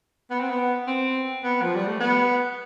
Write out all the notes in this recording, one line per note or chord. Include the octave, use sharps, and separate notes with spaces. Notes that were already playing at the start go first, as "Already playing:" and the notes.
B3
C4
B3
C4
B3
F3
G3
A3
B3